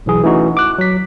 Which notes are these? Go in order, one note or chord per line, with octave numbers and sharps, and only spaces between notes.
B1 E3 G#4
E3 A3 C#4 D#4 F#4
D6 F#6
F#3 B6